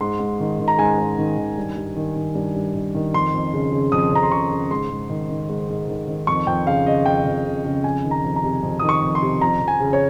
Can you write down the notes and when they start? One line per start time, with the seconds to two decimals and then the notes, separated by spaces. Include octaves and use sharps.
0.01 G#2 C6
0.19 G#2
0.40 D#3
0.59 D#3
0.68 A#5
0.78 G#2 G#5
0.98 G#2
1.18 D#3
1.38 D#3
1.58 G2
1.77 G2
1.96 D#3
2.16 D#3
2.35 G2
2.55 G2
2.74 D#3
2.95 D#3
3.14 F2 C6
3.34 F2
3.53 C#3
3.72 C#3
3.92 F2 D#6
4.12 F2 A#5
4.23 C6
4.32 C#3 C#6
4.52 C#3
4.71 G#2 C6
4.90 G#2
5.10 D#3
5.29 D#3
5.49 G#2
5.69 G#2
5.88 D#3
6.08 D#3
6.27 F2 C#6
6.47 F2 G5
6.67 C#3 F5
6.86 C#3 D#5
7.06 F2 G5
7.26 F2
7.45 C#3
7.65 C#3
7.84 F2 G#5
8.04 D#3
8.11 A#5
8.24 F2
8.36 A#5
8.44 C3
8.63 F2
8.79 D#3 D#6
8.89 C#6
9.03 F2
9.15 C6
9.22 C3
9.41 F2 A#5
9.61 F2
9.68 G#5
9.80 C#3
9.93 C#5